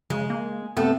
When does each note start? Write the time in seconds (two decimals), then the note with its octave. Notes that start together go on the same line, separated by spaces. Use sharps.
0.10 C#3 G#3
0.30 A#3
0.77 C3 A3 B3 A4